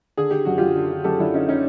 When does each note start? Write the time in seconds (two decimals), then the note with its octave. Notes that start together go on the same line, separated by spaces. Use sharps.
0.17 D3 G#4
0.31 D3 G4
0.45 F#2 F#4
0.58 F#2 F4 G4
0.75 D3
0.91 D3
1.04 F#2 G4 A4
1.19 F#2 D4 E4
1.34 D3 C#4 D#4
1.48 D3 C#4 D#4